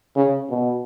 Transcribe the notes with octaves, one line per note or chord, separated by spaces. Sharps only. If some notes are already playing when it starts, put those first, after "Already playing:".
C#3
B2